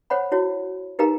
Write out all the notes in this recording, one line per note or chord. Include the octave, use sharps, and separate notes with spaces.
C5 C#5 F#5 B5
E4 F#4 C#5
D#4 G4 A#4 B4 F5 A#5